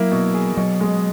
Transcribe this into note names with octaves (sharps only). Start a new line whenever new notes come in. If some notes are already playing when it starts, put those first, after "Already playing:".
Already playing: F#3 A#3 E4
B2
G#4
B2 F#3
G#3